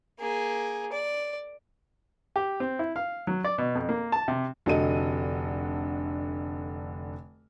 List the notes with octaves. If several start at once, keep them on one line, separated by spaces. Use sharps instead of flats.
A#3 G#4
D5
G4
C4
E4
F5
F#3
D5
B2
F2
A#3
A5
C3
F1 D3 F#4 A4 D#5 D#7